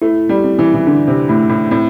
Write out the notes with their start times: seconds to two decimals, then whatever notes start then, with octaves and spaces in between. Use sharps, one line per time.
0.02 A3 E4
0.29 G3
0.44 C4
0.59 E3
0.74 E3
0.87 D3 D4
1.07 C3
1.29 A2 A3
1.49 A2
1.71 A2 C4